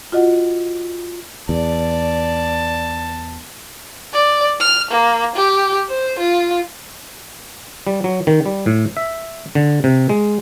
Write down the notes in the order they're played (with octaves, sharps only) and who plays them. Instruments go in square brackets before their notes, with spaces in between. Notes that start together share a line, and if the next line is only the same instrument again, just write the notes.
[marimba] F4 F#4 D#5 F#5
[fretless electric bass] E2 [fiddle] D5 [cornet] A5
[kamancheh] D5
F6
A#3
G4
C5
F4
[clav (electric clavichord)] G3
F#3
D#3
G3
A2
E5
D3
C3
G#3